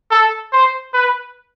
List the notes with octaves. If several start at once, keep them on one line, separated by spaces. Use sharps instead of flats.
A4
C5
B4